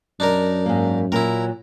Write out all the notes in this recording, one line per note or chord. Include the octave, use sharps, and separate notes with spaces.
F#2 D4 D#4 A#4
G#2 A#3
A#2 F#3 E4 A#4